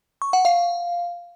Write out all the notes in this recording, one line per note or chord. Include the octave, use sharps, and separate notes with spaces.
C#6
F#5
F5